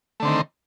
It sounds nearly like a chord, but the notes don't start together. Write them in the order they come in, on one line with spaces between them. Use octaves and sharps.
A3 D3 C4 D#3